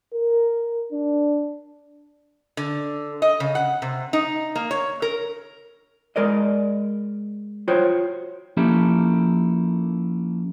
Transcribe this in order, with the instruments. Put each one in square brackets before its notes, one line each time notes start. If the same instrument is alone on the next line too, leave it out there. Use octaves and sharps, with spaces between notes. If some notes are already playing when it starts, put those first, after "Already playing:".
[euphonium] A#4
D4
[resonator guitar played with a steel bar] D3
D#5
C#3
F#5
C3
D#4
A#3
C#5
A#4
[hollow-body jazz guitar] G#3 A#4 D5 D#5
F4 F#4 C5 C#5 G5
[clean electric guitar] F3 A#3 C#4 E4 G4 A4